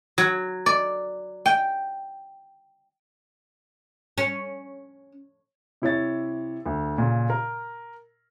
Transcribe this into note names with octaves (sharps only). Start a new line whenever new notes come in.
F#3
D5
G5
C#4
C3 E4 C#5 A6
D2
A#2 C#3
A#4